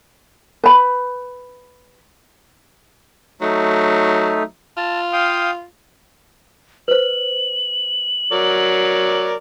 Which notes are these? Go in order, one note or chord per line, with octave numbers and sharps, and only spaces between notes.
B4 B5
F#3 A3 D#4
F4 A5
F5 G5 D#6
B4 C5 F#7
F#3 A#4 D5